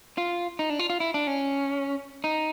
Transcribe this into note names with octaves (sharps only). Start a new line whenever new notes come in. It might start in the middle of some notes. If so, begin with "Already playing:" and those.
F4
D#4
D4
F4
F4
E4
D4
C#4
D#4